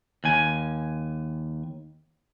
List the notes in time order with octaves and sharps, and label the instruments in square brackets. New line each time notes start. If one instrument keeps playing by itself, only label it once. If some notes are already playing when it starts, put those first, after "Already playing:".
[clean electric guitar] D#2 G#5